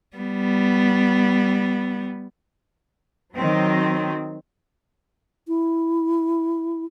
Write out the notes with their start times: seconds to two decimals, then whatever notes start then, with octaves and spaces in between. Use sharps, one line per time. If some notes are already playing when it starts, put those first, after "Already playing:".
0.17 G3 B3
3.34 D#3 F#3 C4
5.48 E4